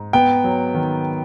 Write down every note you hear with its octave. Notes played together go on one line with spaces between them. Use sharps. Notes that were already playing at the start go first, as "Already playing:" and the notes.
Already playing: G#2
B3 G5
F#3
D#3